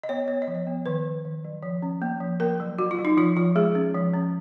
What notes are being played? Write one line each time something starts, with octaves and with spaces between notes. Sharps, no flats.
D#5
B3 C#5
B3 C#5
D#5
F3
C#5
B3
D#3 B4
D#3
D#3
F#3
F3
C#4
A#3
F3
A#3 A#4
F#3
F#3 F#4
F4
F#3
D#4
F3 F4
F3 F4
G#3 G#4
C#4
F3
C#4